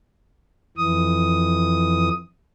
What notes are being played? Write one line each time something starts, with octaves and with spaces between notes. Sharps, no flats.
F2 E3 D#6